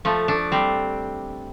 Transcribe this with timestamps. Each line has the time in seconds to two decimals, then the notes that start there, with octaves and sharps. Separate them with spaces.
0.05 F3 A3
0.28 A3 D4
0.52 G3 C4